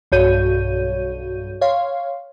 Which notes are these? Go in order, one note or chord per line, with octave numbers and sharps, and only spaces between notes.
B1 G2 F#4 C#5 G6 D#7
C#5 F5 C6